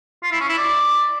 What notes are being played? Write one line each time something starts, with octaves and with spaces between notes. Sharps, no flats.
F4
E4
C#4
E4
D5